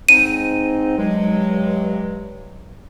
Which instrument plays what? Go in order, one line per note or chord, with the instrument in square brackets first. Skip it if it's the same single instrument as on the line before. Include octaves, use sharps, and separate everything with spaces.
[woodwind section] G#2 C4 D#4 [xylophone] D#7
[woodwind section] G2 F#3 G#3